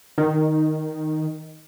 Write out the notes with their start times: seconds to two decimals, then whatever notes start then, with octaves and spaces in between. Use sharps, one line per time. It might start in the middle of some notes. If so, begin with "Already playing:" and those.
0.18 D#3